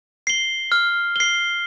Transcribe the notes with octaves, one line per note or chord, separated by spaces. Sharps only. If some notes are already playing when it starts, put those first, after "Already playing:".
C7 G7
F6
C7 G7